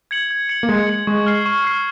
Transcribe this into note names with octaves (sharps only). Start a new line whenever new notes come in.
G#6 C#7 F#7
G#6
C#7 F#7
A#3
G#3 G#6
C#7 F#7
G#3 C#6
F6 C7
C#6
F6 C7